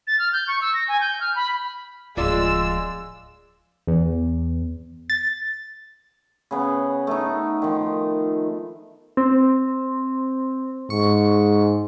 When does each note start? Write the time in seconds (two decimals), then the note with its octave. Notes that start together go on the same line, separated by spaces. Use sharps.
0.07 A6
0.19 F6
0.33 G6
0.48 C#6
0.61 E6
0.74 A#6
0.88 G#5
1.01 G6
1.20 F6
1.36 B5
2.17 D1 F3 G#3 F4 D5 E6
3.87 E2
5.10 A6
6.51 C#3 B3
7.07 A3 D#4
7.62 D#3 F3
9.17 C4
10.90 G#2 C#6